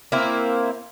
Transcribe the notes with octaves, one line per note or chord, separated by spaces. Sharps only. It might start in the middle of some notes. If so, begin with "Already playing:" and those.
A#3 C4 E4